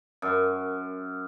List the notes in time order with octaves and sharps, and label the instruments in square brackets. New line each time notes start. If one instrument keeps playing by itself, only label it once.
[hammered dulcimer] F#2